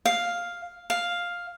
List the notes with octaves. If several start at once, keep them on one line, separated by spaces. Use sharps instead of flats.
F5
F5